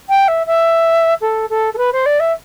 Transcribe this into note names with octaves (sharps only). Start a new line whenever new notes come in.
G5
E5
E5
A4
A4
A4
B4
C5
D5
E5